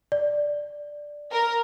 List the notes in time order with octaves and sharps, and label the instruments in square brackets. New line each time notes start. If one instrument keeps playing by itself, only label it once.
[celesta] D5
[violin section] A#4